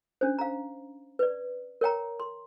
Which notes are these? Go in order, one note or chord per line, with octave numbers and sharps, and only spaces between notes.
C#4 D4 C5
F5 A#5
B4 D5
A#4 C#5 G5 A#5
C6